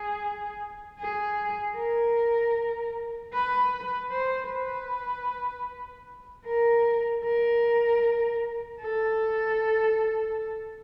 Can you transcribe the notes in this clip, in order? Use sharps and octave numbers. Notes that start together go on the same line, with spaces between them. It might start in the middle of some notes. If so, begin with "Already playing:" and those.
Already playing: G#4
G#4
A#4
B4
C5
B4
A#4
A#4
A4